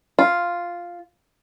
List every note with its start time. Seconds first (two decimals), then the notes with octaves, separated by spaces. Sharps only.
0.19 F4